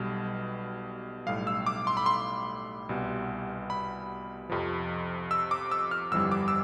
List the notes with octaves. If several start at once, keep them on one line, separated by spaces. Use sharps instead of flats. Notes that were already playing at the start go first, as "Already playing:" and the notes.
Already playing: B1 B2 G3
B1 A2 G3 F5
E6
D6
C6
B5
C6
C2 B2 G3
B5
F2 C3 F3
E6
D6
E6
F6
G1 F2 E3 G3 E6
D6
E6